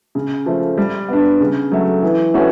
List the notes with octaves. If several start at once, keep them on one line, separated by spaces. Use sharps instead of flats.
C#3
F3 A3
G3
B3 D4
C#3
F#3 A3
E3
A3 C#4 F#4 B4